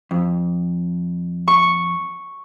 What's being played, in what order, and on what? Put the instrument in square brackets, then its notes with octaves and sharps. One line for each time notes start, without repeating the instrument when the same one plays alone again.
[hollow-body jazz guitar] F2
[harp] C#6